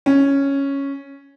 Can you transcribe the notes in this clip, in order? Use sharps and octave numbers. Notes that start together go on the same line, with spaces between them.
C#4